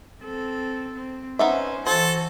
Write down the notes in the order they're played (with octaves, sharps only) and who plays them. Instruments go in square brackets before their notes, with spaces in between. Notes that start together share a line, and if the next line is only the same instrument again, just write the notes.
[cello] C4 A4
C4
[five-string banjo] B3 D#4 E5 [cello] C#4 C5
[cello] E3 F#4 [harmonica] A4 [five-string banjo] C5